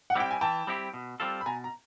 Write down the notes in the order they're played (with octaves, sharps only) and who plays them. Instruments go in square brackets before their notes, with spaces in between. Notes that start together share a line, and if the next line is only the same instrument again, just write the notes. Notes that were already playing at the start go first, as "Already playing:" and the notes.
[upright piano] F#5
[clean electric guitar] G3 C4 E4 G4 [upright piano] G5
[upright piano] G#5
[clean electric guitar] E3 [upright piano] G5 A5
[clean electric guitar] G3 C4 E4 G4
B2
G3 C4 F4 A4
[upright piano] B5
[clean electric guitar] B2 [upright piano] G#5 A#5
[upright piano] A#5